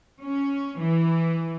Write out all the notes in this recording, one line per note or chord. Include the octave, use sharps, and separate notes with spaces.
C#4
E3